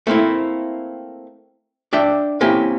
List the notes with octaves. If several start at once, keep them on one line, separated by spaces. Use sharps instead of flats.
A3 A#3 C4 E4
D4 D5 E5 G5
A#3 C4 C#4 E4 G4